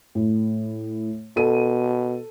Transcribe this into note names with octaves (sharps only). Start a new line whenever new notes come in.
A2
B2 A4 D#7